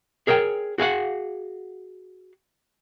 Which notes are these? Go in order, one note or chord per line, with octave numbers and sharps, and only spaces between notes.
G#4 A#4 C#5 E5 G5
F#4 G#4 F5 F#5